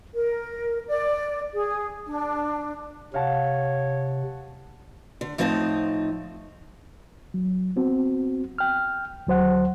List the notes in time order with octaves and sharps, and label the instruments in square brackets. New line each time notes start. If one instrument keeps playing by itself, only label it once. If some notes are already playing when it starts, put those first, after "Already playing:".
[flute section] A#4
D5
G#4
D4
[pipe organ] C3 [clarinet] C#5 [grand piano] F5 F#5 A5
[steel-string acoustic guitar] D3
A2 F3 C4 D#4 D5 A5
[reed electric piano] F#3
B3 C4 F#4
G5 F6
D2 F#3 C5 F#5